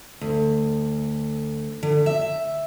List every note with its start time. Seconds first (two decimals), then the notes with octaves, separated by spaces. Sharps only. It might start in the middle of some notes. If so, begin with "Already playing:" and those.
0.21 D2
1.83 D3
2.06 E5